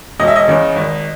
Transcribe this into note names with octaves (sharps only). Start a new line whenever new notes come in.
E1 D#5
E5
D#5
E2 C#3
G#1